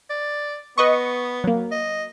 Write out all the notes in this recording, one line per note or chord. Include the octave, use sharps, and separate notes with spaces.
D5
B3 B4 D#5 C#6
F#3 A#3
D#5